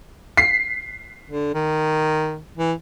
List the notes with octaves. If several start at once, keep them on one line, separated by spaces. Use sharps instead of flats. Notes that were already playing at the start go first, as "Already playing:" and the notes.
B6 C7
D3
D#3
E3